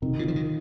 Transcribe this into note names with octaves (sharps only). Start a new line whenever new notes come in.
C3 D#3
C#3 F4
F3
D#3